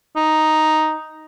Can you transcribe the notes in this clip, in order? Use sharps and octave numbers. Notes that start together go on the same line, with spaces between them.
D#4